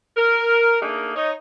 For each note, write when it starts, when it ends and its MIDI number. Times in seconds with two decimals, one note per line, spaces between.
0.16 0.77 70
0.81 1.12 57
0.81 1.12 58
0.81 1.12 62
0.81 1.12 63
0.81 1.12 68
0.81 1.12 70
1.15 1.32 63
1.15 1.32 73
1.15 1.32 75